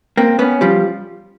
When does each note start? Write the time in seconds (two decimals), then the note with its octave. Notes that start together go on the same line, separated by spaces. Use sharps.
0.17 A#3 C4
0.39 B3 C#4
0.61 F3 G3